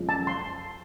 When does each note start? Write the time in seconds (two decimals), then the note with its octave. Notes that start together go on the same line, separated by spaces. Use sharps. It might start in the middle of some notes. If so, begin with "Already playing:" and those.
Already playing: F#2 C#3 F3 G#3
0.09 A5
0.27 C6